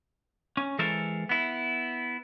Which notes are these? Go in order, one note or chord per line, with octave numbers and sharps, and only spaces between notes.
C#4
E3 G#3 A4 A#4 C5 E5
B3 E4